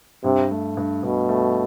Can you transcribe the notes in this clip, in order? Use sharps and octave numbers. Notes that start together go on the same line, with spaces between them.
G2 C3
A3
G2
G2 B2
A3